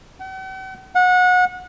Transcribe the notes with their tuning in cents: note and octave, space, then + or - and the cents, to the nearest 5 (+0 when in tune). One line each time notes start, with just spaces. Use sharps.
F#5 +45
F#5 -25